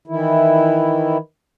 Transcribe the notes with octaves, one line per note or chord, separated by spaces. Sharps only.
D#3 E3 E4